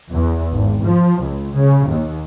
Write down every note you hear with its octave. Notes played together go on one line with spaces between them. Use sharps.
E2
G#1
F3
C#2
C#3
D#2